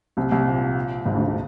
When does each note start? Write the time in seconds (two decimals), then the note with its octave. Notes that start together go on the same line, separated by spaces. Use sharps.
0.17 C2 C3
0.31 C2 C3
0.46 A#1 A#2
1.05 G#1 G#2
1.15 D2 D3
1.25 D3